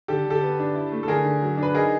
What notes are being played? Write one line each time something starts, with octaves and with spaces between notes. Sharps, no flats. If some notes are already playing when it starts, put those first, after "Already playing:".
D3 G4 A4
D3
G4 A4
B3
D4
E4
A3
A4
D3 G#4 A#4
D3
F#3
D4
B4
D#4 G#4 A#4